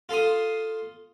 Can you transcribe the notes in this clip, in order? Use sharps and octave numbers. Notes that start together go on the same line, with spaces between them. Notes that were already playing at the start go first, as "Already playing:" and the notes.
F4 A4 C6 D#6